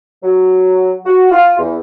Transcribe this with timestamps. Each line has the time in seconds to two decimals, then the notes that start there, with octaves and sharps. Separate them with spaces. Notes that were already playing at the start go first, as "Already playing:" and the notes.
0.22 F#3
1.05 F#4
1.31 F4
1.58 E2